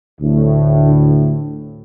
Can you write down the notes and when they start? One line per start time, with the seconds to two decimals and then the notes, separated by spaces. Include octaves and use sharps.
0.21 D2 A2